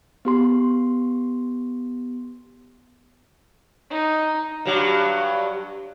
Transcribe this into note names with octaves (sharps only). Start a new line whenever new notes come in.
B3 G4 C6
D#4
G2 F#3